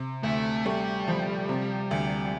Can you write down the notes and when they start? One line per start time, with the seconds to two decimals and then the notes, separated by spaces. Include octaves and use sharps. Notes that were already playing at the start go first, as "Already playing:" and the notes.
Already playing: C3
0.23 D2 A3
0.65 G3 A3
1.08 F3
1.49 C3
1.91 D2